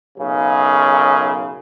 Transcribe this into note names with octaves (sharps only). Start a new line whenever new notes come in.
B1 F#2 C#3